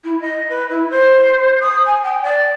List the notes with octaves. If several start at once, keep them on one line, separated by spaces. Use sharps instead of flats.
E4
D#5
B4
E4
C5
D#6
G#5
G5
D5